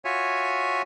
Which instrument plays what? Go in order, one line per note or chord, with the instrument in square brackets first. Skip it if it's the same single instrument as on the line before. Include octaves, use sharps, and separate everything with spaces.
[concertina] F4 F#4 C#5 E5 G#5